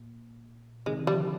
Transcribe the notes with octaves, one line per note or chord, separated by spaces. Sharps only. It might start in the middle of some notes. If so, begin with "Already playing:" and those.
Already playing: A#2
C3 D#3 G#3
D#3
D3 F3 G3